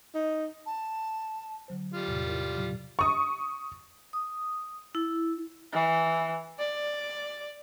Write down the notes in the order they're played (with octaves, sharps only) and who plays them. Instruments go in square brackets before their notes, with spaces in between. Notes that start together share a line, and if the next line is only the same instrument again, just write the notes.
[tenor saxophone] D#4
[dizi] A5
[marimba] D3 F#3 C5
[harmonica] G3 F4
[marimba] E2 A2 C3
C3 E4 A#4
A#2 C#3 F#3
[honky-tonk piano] C#6 D#6
[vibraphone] D#6
E4
[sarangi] E3
D5